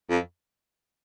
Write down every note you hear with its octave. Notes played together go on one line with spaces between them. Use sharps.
F2